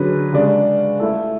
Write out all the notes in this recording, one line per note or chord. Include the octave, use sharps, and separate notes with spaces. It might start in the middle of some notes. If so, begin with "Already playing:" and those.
Already playing: D3 F#3 C#4 G#4 B4
C#3 G#3 D4
A3 E4 A4